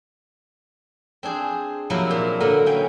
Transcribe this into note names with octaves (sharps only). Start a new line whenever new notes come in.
C4 D4 G#4 C5
C3 F3 F#3 A#3 E4 A#4
A#2
D3 F#3 A#3 B3 A#4
A#3 B3 C#4 G5